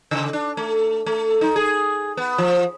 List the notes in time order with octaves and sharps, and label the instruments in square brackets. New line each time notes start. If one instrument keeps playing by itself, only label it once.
[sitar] C#3
D4
A3
A3
D#4
G#4
B3
F3